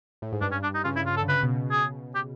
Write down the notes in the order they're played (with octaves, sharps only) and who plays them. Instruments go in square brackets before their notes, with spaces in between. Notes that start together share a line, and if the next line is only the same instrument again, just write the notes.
[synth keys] A2
G#2
[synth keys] G2 [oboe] D4
[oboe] C#4
D4
D#4
[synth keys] C#3 [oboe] F4
[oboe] E4
F4
A4
[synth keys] D3
[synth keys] C#3 [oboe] B4
[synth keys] B2
B2
[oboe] G#4
G4